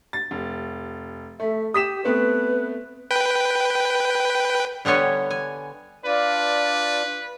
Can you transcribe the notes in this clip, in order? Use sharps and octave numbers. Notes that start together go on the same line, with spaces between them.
A6
F1
A3 E5
G4 D#6 B6 E7
A3 B3 C4 B4
B4 G5
D3 G3 B3 C#5 G#5
G#5
D4 F4 B4 D5